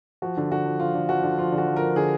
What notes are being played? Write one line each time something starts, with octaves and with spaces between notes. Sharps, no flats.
F3 F#4
D3
D3 F#4
F3
F3 F4
D3
F3 F#4
D3
F3 F4
D3
F#4
F3
A#4
F3
D3 G#4